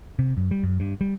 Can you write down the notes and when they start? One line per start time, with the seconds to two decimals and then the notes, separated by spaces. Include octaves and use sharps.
0.19 C3
0.37 F#2
0.51 G3
0.63 F#2
0.80 G2
1.01 G3